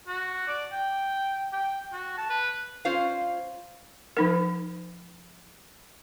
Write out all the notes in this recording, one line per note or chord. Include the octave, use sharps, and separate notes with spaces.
F#4
D5
G5
G5
F#4
A5
B4
C#4 F4 C5 D5 F5
F3 D#4 A#4